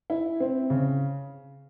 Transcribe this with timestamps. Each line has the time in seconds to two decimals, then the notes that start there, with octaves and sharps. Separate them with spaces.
0.10 E4
0.40 C4
0.70 C#3